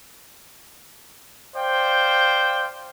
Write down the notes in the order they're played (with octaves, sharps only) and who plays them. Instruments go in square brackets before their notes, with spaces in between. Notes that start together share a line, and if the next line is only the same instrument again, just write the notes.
[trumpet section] C5 D5 F5 G5